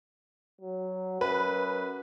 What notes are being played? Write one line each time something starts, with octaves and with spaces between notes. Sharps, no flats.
F#3
F#2 B4